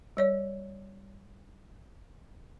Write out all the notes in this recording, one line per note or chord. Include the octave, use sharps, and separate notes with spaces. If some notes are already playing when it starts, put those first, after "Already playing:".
G3 C#5 D5